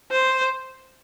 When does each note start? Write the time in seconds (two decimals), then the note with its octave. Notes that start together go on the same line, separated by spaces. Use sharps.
0.11 C5